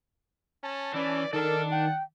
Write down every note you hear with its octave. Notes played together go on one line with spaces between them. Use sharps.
C#4 A5
E3 C#4 D5
D#3 A4 A#4 D5 A5
F#5 G5